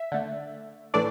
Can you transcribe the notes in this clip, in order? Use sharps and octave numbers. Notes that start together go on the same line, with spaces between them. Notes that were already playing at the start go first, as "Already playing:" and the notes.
Already playing: E5
D3 A3
A2 E3 A3 D4 D5